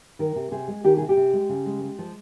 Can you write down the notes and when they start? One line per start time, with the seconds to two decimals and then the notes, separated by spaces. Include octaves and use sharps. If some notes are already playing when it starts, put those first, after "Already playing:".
0.19 D#3 A#4
0.36 C3
0.51 C3 G#4
0.68 G#3
0.84 D#3 G4
0.97 C3 G#4
1.09 G4
1.17 C3
1.33 G#3
1.49 C#3
1.66 G#3
1.82 G#3
1.99 F3